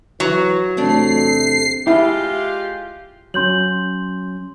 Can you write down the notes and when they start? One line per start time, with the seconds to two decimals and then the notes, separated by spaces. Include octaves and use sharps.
0.20 E3 F#3
0.77 E2 C3 A3 D4 C7
1.87 G#3 E4 F4 G4
3.34 F#3 C#4 C6 G6 F#7